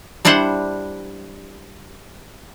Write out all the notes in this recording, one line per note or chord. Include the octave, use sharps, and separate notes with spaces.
G3 D4 E4 C5 F#5